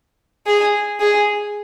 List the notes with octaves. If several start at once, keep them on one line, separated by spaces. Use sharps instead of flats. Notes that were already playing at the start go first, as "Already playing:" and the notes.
G#4
G#4